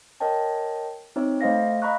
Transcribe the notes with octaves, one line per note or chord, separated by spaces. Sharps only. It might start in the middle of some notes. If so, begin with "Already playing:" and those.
A#4 C#5 D#5 G5 A5
C4 D#4 C#5 E5
A3 C5 D#5 F5 A#6
D#5 F5 A#5 B5 C#6 F#6